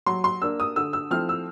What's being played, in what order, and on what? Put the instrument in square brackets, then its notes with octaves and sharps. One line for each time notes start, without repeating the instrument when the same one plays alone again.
[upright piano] F#3 C6
C6
A#3 D4 E6
D#6
D3 E6
E6
F3 A3 C4 E4 F6
E6